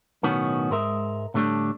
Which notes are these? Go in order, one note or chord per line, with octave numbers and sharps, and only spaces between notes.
B1 A2 D#3 B3 C#4 F#4
G#2 G#3 A#4 E5
A2 D3 G3 A3 D4